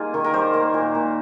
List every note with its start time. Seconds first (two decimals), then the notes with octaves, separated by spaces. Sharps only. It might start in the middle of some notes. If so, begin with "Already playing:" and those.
Already playing: G3 A#3 D#4 F4 G#4
0.14 D#3
0.24 A#4
0.33 G3 C5
0.54 A#3
0.74 A#2
0.95 A#2